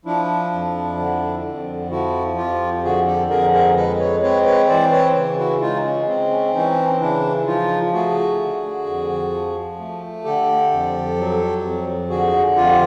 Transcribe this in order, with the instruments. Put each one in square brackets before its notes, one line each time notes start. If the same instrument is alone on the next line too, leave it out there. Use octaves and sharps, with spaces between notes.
[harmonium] F3 D4 E4
F2
D3
F2
F3 E4 F#4
F2 F4 G4
D3 F#4 G#4
G4 A4
F2 G#4 A#4
G#4 A#4
G#3 A4 B4
B4 C#5
C4 B4 C#5
B4 C#5
E3 C5 D5
B4 C#5
C#3
E4 F#4
G#3 D#4 F4
C#4
C4
C#4
E3 C#4 D#4
C#3 D4 E4
F3 D#4 F4
A3 F#4 G#4
D3
F2
F3
A3
D3 G4 A4
F2
F#3
F2
D3 F#4 G#4
F2 F4 G4